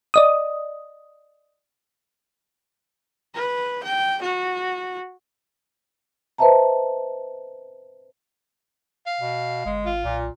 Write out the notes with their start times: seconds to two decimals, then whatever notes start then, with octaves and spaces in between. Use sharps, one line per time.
0.14 D5 D#5 D#6
3.35 B4
3.84 G5
4.22 F#4
6.38 B4 C5 D#5 E5 A5 A#5
9.06 F5
9.21 B2
9.65 G1 G#3
9.86 G#1 F4
10.04 B1 A#2